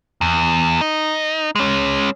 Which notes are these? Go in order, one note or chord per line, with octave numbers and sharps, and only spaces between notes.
E2
D#4
G#3 C#4